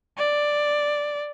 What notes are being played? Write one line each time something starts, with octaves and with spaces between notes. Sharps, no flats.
D5